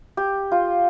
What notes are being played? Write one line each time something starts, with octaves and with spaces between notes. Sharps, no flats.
G4
F4